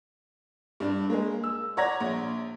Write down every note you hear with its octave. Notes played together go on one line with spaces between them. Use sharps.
G2 D4
G#3 A#3
E6
C#5 D5 F#5 A#5 G#6 A#6
A#1